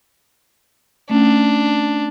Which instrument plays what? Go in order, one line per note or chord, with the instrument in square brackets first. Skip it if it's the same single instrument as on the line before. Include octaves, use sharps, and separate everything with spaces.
[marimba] A3 C#4 [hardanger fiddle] D4